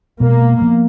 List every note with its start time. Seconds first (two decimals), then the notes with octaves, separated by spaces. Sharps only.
0.20 B2 G#3 A#3 B3
0.62 F3 B3